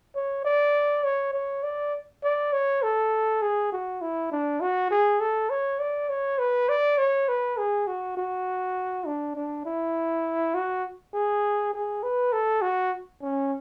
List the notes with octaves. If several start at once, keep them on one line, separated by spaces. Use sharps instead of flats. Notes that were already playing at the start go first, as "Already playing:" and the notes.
C#5
D5
C#5
C#5
D5
D5
C#5
A4
G#4
F#4
E4
D4
F#4
G#4
A4
C#5
D5
C#5
B4
D5
C#5
B4
G#4
F#4
F#4
D4
D4
E4
F#4
G#4
G#4
B4
A4
F#4
C#4